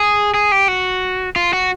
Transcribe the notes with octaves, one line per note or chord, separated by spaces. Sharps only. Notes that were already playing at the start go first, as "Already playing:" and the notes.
Already playing: G#4
G#4
G4
F#4
F4
F#4